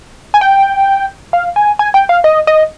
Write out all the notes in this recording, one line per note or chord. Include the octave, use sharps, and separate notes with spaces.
G#5
G5
F5
G#5
G#5
G5
F5
D#5
D#5